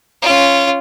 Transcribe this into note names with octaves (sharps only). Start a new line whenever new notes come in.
C#4 F4